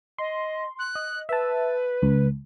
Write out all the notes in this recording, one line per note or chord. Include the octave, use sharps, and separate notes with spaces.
D#5 C6
F#6
D#5
B4 E5 A5
C#2